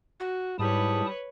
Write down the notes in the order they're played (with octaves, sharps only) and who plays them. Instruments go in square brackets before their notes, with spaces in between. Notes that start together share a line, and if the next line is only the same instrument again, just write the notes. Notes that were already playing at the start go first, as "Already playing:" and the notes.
[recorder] F#4
[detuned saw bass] G#2 [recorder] G3 [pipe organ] E4 A5 D#6 [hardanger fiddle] B4 C#5